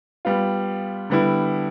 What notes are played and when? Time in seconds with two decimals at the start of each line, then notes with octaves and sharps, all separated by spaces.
0.25 G3 B3 F4
1.10 D3 G3 B3 E4